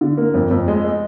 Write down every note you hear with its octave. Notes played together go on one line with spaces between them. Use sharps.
D3
A#3
F2
F2
G#3
G#3